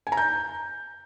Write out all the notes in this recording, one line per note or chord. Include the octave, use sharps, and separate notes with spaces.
G#5
A#5
G6